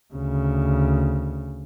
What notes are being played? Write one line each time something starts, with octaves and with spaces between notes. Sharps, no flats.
D2 C#3